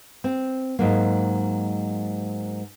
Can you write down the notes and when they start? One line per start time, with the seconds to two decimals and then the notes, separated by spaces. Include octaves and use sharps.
0.24 C4
0.79 G#2 F#3 A#3